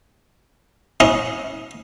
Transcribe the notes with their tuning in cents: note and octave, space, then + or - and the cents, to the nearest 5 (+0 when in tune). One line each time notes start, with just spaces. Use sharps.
C#4 +0 E4 -45 D#5 +0